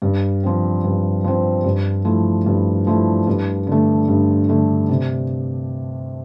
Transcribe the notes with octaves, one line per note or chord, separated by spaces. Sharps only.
G2
F3 C4
G2
F3 C4
G2
F3 A3 E4
G2
F3 A3 E4
G2
D3 A3
G2
D3 A3
C3